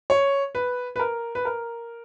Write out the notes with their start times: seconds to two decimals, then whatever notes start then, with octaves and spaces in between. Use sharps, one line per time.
0.10 C#5
0.55 B4
0.96 B4
1.00 A#4
1.35 B4
1.45 A#4